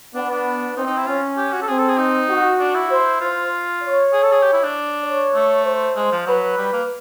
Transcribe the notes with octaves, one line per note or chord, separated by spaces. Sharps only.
B3 D4
D4
C4 D#4
D#4
E4
C#4 F4
G4
F#4
A4
C4 G#4
A4
G#4
D#4
F#4
D4
E4
C5
F4 C5
C#5
G#4
A4
G#4
G4
E4
D4
C#5
A3
C5
G#3
F3
F#3 B4
G3
A#3